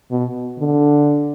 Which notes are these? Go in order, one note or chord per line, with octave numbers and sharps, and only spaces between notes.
B2
D3